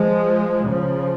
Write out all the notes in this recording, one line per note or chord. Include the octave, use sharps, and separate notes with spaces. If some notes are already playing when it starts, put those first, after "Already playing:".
Already playing: F3 G#3
C#3 F3